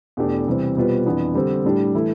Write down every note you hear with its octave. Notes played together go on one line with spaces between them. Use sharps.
E2 B2 A3 D4 G4
C3 E3 G3 C4
B2 G3 C4 F4 B4
F2 E3 B3 D4
D3 G3 C4
A2 G3 D4 G4
E3 A3 E4